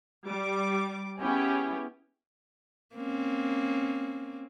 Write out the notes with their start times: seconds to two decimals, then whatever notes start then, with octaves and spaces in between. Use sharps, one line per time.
0.24 G3 D6
1.19 B3 C#4 E4 G4 G#4
2.95 A#3 C4 C#4